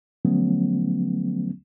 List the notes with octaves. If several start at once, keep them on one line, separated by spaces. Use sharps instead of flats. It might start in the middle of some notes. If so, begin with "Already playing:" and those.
D3 F3 F#3 A3 B3 C#4